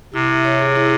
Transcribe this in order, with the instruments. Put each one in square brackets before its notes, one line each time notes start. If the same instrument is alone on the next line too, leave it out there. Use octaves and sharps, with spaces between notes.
[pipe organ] C3 [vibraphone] E4
[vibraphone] E5
C#5
G#4
E4